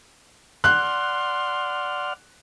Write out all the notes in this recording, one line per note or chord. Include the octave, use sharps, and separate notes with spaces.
D5 F#5 C6 F6 F#6